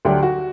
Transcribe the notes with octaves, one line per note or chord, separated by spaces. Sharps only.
D2 D3 F#3 G4
F#4